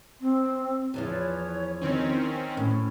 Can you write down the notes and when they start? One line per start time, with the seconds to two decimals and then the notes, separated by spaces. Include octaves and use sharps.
0.21 C4
0.94 E2 E3 F3 C#5
1.82 D#3 C4 C#4
2.57 A2 C#4